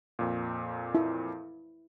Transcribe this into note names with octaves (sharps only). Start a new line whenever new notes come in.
F2 A#2
E4